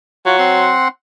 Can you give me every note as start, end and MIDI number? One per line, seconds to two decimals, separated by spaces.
0.26 0.72 54
0.26 0.36 65
0.26 0.36 66
0.38 0.88 60
0.38 0.88 78
0.38 0.88 84